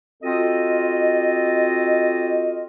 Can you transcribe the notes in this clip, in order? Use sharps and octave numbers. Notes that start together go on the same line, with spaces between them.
C4 F4 F#4 A4 D#5